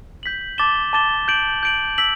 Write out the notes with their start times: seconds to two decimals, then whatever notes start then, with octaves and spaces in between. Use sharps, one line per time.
0.23 G6 B6 F#7
0.58 A5 D6 A6 E7 G7
0.93 A5 D6 A6 E7 G7
1.28 G6 D7 F#7
1.63 G6 D7 F#7
1.98 E6 B6 F#7